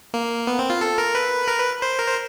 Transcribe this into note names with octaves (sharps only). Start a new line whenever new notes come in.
A#3
B3
C4
F4
A4
A#4
B4
A#4
B4
C5
A#4
C5